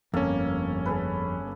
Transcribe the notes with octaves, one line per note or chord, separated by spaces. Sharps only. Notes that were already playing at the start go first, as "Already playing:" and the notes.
G1 F2 A#3 C#4 A4 F5
G#4 A4 B4